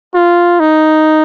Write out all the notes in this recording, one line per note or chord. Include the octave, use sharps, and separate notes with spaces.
F4
D#4